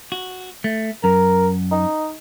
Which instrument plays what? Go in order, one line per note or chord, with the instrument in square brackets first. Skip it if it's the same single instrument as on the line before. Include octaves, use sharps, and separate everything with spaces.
[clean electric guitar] F#4
A3
[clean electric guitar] F#2 [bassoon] A#4
[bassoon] D#4